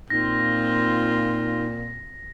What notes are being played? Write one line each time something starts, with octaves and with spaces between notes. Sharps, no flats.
A#2 C4 D#4 F4 A#6